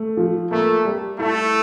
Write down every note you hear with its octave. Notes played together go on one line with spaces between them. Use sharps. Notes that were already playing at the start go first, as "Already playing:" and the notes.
Already playing: A3
F3
A3 A#3
G3
A3 E4